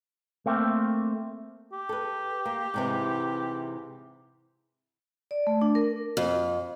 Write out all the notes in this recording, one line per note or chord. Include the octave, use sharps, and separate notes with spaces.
A3 A#3 C4
G4
A4 B4
A#3
G#2 C3 E3
D5
A3
D4
A#4
F2